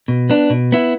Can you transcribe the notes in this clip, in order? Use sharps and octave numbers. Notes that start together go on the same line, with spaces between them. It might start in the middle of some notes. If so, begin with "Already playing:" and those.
B2
B3 D4
B2
B3 E4